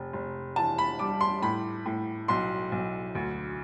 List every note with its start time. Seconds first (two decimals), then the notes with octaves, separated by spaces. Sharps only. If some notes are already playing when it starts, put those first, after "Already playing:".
Already playing: F1
0.13 F1
0.56 E3 A5
0.78 B5
0.99 G3 D6
1.21 C6
1.42 A2 B5
1.86 A2
2.28 B1 C6
2.72 B1
3.15 D2